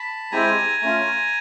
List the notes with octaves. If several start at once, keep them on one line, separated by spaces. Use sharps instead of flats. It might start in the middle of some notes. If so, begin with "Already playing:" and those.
Already playing: A5 B5
G#3 C4 E4 G4 G#5 A#5
A3 C#4 F4